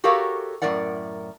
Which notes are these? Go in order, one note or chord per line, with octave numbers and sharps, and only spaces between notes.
F#4 G4 A4 A#4 C#5 F5
F#2 A2 A#4 D5 F#5